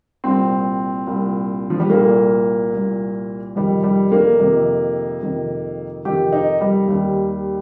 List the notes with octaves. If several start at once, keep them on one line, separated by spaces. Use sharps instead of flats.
C2 A#2 C4
C2 A#2
F3
G3
C2 A#2 A#3
C2 A#2
F2 C3 D#3 G3
G3
A#3
F2 C3 D#3
F2 C3 D#3
F2 C3 D#3 G4
D#4
G3
D#2 D#3